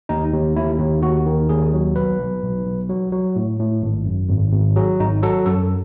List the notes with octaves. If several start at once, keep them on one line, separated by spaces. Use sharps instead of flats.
D#2 D#4
D#2
D#2 E4
D#2
D#2 F#4
D#3
D#2 G#4
F#3
B1 B4
B1
B1
B1
F#3
F#3
A2
A2
G#1
F#2
G#1
G#1
F#3 G#4
G#1 D#4
F#3 A4
F#2 A4